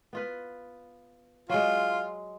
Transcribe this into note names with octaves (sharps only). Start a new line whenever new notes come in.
B3 F4 B4
F#3 G#3 F4